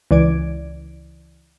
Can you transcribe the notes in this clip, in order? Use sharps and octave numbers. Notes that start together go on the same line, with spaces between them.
C#2 E3 D5 G#6 D7